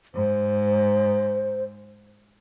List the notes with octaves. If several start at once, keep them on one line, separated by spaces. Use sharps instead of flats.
G#2 C5